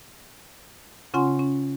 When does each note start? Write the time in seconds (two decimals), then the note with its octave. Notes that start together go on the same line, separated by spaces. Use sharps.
1.14 C#3 C#4 F4 F#5 G#5 C6
1.39 C#4